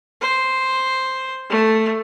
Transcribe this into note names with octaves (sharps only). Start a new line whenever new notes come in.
C5
A3